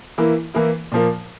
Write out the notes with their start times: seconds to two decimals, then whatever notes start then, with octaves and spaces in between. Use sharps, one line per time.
0.18 E3 A#3 E4
0.54 E3 A#3 E4
0.92 A#2 F3 A#3